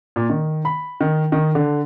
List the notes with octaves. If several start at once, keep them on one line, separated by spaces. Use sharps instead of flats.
A#2
D#3
B5
D#3
D#3
D3